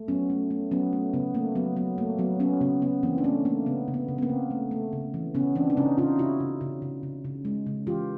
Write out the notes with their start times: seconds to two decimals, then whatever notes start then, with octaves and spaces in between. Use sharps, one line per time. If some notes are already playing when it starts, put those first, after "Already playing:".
Already playing: A3
0.08 F#3 B3 C#4
0.30 A3
0.51 A3
0.71 F#3 B3 C#4
0.93 A3
1.14 C#3 B3
1.34 A3 A#3
1.55 F#3 B3
1.76 F#3 B3
1.98 A3 A#3
2.18 F#3 B3
2.40 F#3 B3 C#4
2.61 C#3 B3
2.82 C#3 B3
3.03 E3 A#3 C4
3.18 D4
3.24 A3 B3 C#4
3.45 A3 A#3
3.66 C#3 B3
3.88 C#3
3.94 B3
4.08 C#3
4.18 B3
4.22 A#3 C4
4.29 C#3
4.51 A3
4.71 A3
4.93 C#3
5.14 E3
5.35 C#3 B3 C#4
5.55 E3 C4 D4
5.70 D4
5.77 C#3 C#4 D#4
5.98 C#3 D#4 F4
6.19 C#3 E4 F#4
6.40 C#3
6.61 C#3
6.82 C#3
7.03 C#3
7.25 C#3
7.45 G#3
7.67 C#3
7.87 E3 F4 G4